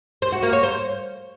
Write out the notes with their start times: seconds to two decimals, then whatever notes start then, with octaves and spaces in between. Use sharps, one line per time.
0.22 C5
0.32 F#4
0.43 A#3
0.53 C#5
0.63 C5